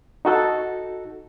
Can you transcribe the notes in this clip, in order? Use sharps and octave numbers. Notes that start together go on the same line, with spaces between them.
D#4 F#4 A4